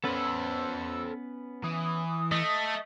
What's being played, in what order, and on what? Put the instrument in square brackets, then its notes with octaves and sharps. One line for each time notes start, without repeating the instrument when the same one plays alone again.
[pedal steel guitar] B3 C#4 B4 [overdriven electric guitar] A4 C5 [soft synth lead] E6
[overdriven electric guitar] E3 [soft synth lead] D#6
[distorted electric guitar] A3 [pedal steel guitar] D#5